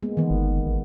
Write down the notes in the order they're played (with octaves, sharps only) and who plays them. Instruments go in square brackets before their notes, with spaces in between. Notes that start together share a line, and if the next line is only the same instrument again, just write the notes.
[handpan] G#3 A#3 B3
[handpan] D#3 B3 [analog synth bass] E3
[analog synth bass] G1
A1